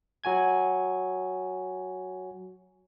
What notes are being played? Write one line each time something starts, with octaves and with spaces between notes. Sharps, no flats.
F#3 F#4 G#5 G#6